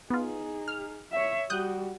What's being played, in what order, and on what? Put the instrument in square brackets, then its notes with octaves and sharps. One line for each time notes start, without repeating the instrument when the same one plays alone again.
[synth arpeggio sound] B3 F4 [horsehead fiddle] D#4 G#4
[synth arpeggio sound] F6
[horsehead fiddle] C#5 E5
[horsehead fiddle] G3 F#4 [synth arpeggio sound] D#6 F#6 G6